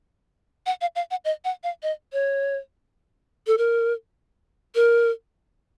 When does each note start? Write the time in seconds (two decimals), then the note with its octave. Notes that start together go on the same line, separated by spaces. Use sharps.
0.66 F#5
0.81 F5
0.96 F5
1.11 F#5
1.25 D#5
1.45 F#5
1.63 F5
1.83 D#5
2.13 C#5
3.47 A4
3.58 A#4
4.75 A#4